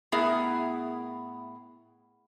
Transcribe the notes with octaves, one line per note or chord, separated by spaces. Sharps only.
A2 B3 E4 G#4 A#4 E5